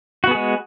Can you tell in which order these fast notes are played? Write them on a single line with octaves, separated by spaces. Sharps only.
F#4 B3 G#4 G#3